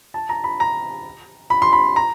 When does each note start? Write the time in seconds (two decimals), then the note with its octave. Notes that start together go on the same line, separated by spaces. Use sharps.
0.14 A5
0.29 A#5
0.44 B5
0.60 A#5
1.50 B5
1.62 C6
1.73 B5
1.96 A#5